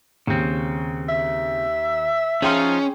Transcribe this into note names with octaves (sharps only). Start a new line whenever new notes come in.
D#2 C#3 C4
E5
F3 C#4 D#4 F4 G#4 G5 C6